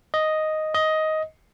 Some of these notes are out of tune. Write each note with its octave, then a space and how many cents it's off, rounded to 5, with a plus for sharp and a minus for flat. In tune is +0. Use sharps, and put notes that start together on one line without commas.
D#5 +0
D#5 +10